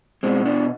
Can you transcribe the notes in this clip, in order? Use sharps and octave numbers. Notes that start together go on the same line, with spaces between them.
B2 G#3 C4
B3 D4